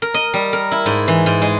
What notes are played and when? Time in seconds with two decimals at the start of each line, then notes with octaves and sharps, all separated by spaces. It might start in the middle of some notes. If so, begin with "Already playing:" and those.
0.02 A#4
0.14 D#5
0.34 G3
0.53 A#4
0.71 E4
0.86 G#2
1.08 E3
1.26 G#2
1.42 G#3